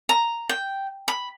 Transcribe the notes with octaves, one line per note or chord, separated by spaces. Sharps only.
A#5
G5
B5